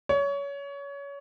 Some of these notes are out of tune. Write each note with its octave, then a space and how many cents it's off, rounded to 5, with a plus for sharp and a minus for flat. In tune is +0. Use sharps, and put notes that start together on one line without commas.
C#5 +25